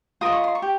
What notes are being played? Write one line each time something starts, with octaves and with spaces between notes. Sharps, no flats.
F4 A#4 D#5 D#6
C#6
C6
C#6
G4